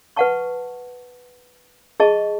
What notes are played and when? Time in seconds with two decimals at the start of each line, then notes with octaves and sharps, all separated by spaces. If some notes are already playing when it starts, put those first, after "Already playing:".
0.16 B4 F#5 A5 C#6
2.00 G#4 D#5 A5 C#6